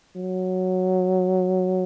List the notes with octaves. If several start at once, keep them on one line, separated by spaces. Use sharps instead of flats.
F#3